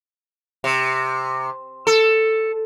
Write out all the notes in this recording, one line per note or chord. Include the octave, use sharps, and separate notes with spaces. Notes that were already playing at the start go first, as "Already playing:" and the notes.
C3
A4